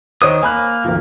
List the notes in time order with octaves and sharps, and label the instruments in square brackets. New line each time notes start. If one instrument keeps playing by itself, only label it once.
[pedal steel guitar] D#3 D#6 [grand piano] C5 C#5 D#5
[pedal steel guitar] A#3 [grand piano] G#5 B5 F#6
[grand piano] G#1 D2 F3